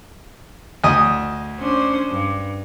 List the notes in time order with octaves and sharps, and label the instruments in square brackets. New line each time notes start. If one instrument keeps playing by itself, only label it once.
[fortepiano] D2 D#5 D#6
[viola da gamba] C#4 D4 C5
G2